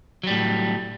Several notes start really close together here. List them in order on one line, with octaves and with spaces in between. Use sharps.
F#3 G3 A2